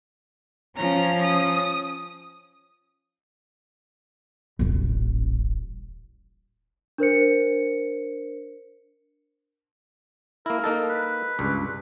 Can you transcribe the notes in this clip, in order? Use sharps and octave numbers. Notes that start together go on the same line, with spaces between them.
F3 C#4 A#5
D#6
D#1 A1
D4 A#4 C5 C#7
A#3 E4 A#4
A#3 D#4 A4
B4
C#2 G2